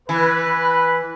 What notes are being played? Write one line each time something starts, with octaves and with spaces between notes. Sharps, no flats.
E3 B4